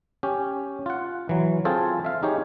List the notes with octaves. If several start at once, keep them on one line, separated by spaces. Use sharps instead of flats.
C#4 G4
F4 F#5
E3 F#3
C4 F4 G#4 A4 C5
E5 F5
D#4 G4 G#4 C#5